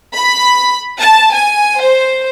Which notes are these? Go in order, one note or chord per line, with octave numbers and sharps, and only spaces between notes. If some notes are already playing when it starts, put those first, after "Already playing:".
B5
A5
G#5
C5